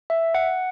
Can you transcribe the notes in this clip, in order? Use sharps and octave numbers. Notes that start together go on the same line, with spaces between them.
E5
F#5